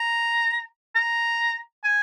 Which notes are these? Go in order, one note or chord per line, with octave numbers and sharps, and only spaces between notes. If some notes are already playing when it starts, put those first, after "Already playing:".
Already playing: A#5
A#5
G#5